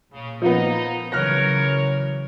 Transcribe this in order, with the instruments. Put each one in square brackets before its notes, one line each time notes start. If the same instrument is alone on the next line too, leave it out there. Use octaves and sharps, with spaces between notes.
[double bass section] A#2 [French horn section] C#3
[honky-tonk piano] F3 A#3 B3 [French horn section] D#4
[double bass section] C#3 E3 F#3 [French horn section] A#4 C#5 [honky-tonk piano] F6 F#6 A#6